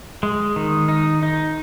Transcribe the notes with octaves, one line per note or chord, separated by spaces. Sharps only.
G#3
D#3
D#4
D#4